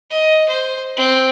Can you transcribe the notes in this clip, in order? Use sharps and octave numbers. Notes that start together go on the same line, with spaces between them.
D#5
C5
C4